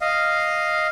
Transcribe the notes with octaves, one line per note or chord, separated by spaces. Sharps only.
D#5 F5